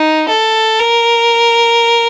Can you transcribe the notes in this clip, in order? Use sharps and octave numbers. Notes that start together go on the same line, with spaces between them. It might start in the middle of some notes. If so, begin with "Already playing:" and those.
Already playing: D#4
A4
A#4